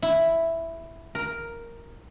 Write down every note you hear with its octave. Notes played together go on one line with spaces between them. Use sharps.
E4
A#4